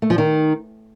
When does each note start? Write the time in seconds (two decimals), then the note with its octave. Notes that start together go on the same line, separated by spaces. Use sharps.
0.02 A3
0.10 F3
0.18 D#3